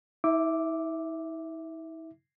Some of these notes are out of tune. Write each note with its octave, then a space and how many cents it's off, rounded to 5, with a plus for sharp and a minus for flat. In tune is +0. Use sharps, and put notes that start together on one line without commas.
E4 -40 E5 +0 D6 +0